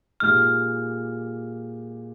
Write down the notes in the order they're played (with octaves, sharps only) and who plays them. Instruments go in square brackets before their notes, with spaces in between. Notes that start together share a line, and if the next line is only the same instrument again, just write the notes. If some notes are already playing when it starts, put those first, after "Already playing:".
[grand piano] A#2 G#3 D#4 G4 [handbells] F6